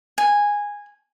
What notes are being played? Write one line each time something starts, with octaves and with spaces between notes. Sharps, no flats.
G#5